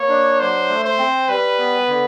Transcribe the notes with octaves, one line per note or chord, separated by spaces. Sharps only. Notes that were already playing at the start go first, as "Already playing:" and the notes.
Already playing: A#3 C#5
D4
F#3 C5
A3
C5
C4
G3 B4
B3
D3